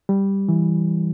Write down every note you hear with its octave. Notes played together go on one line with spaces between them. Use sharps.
G3
E3